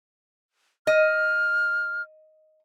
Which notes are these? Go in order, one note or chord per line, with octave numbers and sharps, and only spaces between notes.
D#5 F6